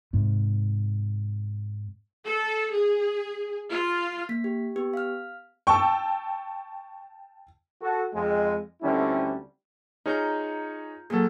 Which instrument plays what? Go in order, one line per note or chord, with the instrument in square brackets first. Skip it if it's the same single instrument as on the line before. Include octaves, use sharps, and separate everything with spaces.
[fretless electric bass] G#2 C3
[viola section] A4
G#4
F4
[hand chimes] A#3 B6
G4
B3 G4
F5 F6
[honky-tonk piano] G5 A5 E6 [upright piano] C#6
[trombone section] F#4 A4
F2 G#3
D2 D3 G3 C4 C#4 E4
[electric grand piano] D#4 G#4 C#5 [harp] F4 A#5 G6
[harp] A#2 F#3 [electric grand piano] G#4 A4